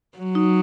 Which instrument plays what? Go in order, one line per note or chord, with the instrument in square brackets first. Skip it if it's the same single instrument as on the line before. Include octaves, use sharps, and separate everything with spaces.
[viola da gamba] F#3
[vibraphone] D#4